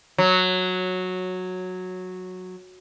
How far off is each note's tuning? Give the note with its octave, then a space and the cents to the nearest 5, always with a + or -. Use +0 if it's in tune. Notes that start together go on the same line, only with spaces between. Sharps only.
F#3 -10